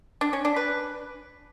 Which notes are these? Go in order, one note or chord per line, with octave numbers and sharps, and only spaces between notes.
D4
C#4
D4
B4